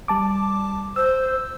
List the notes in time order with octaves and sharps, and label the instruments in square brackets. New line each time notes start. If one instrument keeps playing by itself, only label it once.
[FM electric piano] G3 A5 D6
[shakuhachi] C5 [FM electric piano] E6